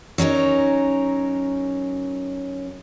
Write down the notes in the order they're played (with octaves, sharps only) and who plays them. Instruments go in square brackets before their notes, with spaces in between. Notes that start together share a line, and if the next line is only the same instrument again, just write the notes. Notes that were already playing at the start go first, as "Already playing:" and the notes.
[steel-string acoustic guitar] F#3 C#4 D#4 A#4